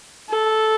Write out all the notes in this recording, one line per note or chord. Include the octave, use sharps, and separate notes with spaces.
A4